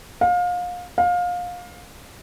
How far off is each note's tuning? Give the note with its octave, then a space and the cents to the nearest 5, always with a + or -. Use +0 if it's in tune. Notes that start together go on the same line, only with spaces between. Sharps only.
F5 +30
F5 +25